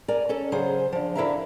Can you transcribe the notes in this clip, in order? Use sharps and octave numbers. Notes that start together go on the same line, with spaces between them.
A#4 D5 G#5 A#5
C#4 A4
C#3 F#3 G#4 C5
D3 F3
D3 E4 A#4 E5 F5 A#5